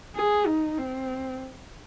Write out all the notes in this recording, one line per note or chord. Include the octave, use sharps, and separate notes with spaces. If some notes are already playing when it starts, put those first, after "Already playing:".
G#4
D#4
C4